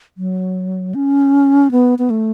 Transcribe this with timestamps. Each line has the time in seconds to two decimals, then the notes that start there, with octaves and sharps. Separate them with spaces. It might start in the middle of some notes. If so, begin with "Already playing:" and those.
0.18 F#3
0.95 C#4
1.71 B3
1.99 B3
2.10 A3